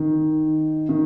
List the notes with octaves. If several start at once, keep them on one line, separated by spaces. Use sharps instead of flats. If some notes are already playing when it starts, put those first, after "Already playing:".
Already playing: D#3
D#3